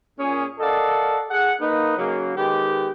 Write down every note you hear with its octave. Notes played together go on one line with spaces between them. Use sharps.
A#2 C#4 G#4
A4 A#4 D5 D#5 F5 F#5
G#4 F#5
A#3 D#4 B4
C#3 F#3 A#3
D#3 G#3 B3 G4